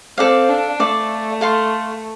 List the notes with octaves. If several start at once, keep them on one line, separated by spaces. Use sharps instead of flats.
C4 A4 D5 F5
D4
A3 A4 D5 F5
A4 F5 C6